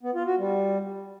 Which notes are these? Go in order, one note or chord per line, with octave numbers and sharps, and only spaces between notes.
B3
F4
F#4
G3